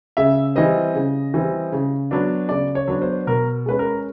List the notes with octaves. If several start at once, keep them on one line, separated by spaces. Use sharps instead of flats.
C#3 E5
E3 G3 C4 D#5
C#3
E3 G3 C4
C#3
F#3 B3 D4
C#3 D5
C#5
F#3 B3 D4
C5
B2 A#4
G#3 C#4 B4
A#4